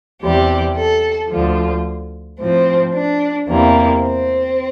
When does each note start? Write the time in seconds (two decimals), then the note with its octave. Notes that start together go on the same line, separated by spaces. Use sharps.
0.21 E2 C3 G3 G4
0.75 A4
1.30 D2 D3 F3 F4
2.39 A2 F3 C4
2.93 D4
3.47 E2 C3 E3 G3 A#3
4.01 C4